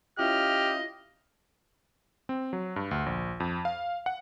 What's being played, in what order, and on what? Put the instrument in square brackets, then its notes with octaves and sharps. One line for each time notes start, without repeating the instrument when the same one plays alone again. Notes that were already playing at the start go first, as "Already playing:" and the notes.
[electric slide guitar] C#4 E4 F4 [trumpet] G4 [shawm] D#5 [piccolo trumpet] F6
[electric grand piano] C4
F#3
G2
D2
A#1
F2
F5
F#5